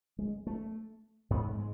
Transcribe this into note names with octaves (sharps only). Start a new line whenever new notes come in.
G#3
A3
G#2 B3
A3
G#3